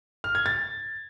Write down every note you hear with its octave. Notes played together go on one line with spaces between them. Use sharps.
F6
G#6
A6